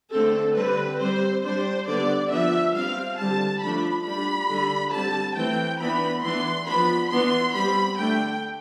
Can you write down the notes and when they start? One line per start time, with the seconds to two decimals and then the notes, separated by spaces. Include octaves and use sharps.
0.12 D3 A3 C4 A4
0.56 D3 G3 C4 B4
1.00 G3 C4 C5
1.44 G3 D4 C5
1.87 D3 G3 B3 D4 D5
2.31 F3 B3 D4 E5
2.75 G3 C4 F5
3.18 D3 G3 C4 A5
3.62 F3 A3 D4 B5
4.05 G3 D4 B5
4.49 D3 G3 D4
4.93 D3 G3 C4 A5
5.36 E3 A3 C4 G5
5.80 E3 B3 D4 B5
6.24 E3 B3 D4 C6
6.67 F3 B3 D4 B5
7.11 E3 B3 D4 C6
7.54 G3 C4 B5
7.98 D3 A3 D4 G5